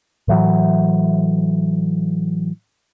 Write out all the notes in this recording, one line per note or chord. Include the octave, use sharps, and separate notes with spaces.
A2 E3 F#3